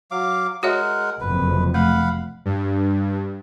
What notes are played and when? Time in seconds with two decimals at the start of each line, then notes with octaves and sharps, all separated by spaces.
0.11 F#3 F5 D6
0.63 G#3 F#4 A#4 C#5 E5 F#5
1.20 F#1 F2 C3 B4
1.74 A3 F5 F#5 B5
2.45 G2